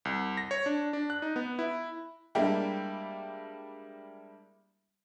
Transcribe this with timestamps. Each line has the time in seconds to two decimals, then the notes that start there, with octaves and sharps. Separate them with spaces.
0.05 C2
0.37 A#6
0.51 C#5
0.66 D4
0.93 D4
1.10 F#6
1.22 D#4
1.36 B3
1.59 E4
2.35 G3 G#3 A#3 D4 E4 G5